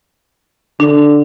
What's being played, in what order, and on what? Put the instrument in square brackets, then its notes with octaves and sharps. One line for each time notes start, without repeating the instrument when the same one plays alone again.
[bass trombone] D3 [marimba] D4